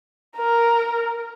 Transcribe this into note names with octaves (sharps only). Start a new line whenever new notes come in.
A#4